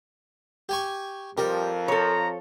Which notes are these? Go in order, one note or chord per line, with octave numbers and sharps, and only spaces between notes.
G4 G#5 C#6
F2 F3 G3 G4 A#4
A4 C#5 A#5